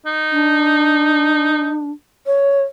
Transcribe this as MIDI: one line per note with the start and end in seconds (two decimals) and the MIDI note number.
0.06 1.86 63
0.32 1.91 62
2.26 2.63 73